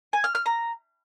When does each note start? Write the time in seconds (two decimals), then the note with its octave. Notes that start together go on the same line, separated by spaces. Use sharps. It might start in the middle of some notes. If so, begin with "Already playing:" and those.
0.13 G#5
0.24 F6
0.35 F6
0.46 A#5